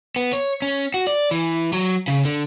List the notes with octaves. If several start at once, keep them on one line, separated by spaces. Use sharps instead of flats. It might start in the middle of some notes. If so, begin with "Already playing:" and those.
B3
C#5
C#4
F#4
D5
E3
F#3
C#3
D3